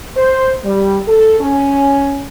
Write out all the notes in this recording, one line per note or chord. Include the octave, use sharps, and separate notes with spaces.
C5
G3
A4
C#4